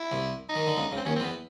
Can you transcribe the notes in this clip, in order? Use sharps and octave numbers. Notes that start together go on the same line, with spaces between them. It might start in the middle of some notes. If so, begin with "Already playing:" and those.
Already playing: E4
C2 C3
D#4
D#3
D3
C#2 C#3
C#2 C#3
C4
D#2 D#3 C#4
C4
E2 E3 B3